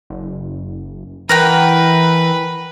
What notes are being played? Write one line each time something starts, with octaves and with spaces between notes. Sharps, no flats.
F#1
E3 A#4 B4 F#5 G5